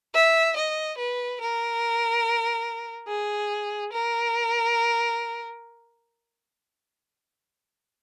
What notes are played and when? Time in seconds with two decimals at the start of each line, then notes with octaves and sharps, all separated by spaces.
0.15 E5
0.56 D#5
0.98 B4
1.41 A#4
3.08 G#4
3.93 A#4